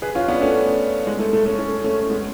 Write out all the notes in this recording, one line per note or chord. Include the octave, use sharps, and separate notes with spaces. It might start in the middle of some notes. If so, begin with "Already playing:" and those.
G#4 B4
C#4 F4
B3 D4
A3 C#4
G#3
A3
A3
A3 C#4
A3 C#4
A3 C#4
C#4
G#3 B3